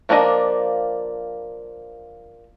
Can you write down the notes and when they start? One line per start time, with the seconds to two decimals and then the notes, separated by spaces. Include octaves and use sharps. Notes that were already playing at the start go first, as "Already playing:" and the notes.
0.09 F3 A#3 D4 G#4 D#5